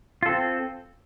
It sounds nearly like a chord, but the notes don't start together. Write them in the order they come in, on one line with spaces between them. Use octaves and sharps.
F4 A4 C4